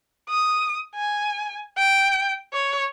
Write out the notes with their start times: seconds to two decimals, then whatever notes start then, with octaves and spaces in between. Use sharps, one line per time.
0.29 D#6
0.95 G#5
1.78 G5
2.53 C#5